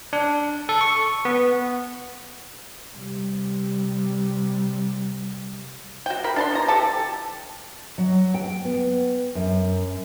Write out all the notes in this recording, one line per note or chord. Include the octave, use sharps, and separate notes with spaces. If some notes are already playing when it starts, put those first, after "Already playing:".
D4
A4
C#6
B3
C3 G3
F#4 G5
A#4 B5
D4 A5 C6
B2 A#5
G4 A4 A5
F#3
G5
B3
F#2